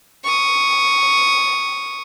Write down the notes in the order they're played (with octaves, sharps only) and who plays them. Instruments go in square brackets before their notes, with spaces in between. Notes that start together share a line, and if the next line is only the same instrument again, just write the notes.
[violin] C#6 D#6